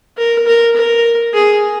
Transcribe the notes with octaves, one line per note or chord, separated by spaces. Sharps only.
A#4
A#4
A#4
G#4